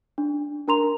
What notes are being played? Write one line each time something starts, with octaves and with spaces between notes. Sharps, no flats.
D4
D4 A#4 A#5 C6 F7